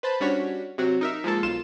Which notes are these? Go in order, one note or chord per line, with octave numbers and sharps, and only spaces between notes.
B4 C5 A5 B5
G3 C#4 D4 F#4 C#5 B6
C3 F#3 C4 F#4
D#4 A#4 E5
F3 G#3 A#3 A4
B1 F4 E7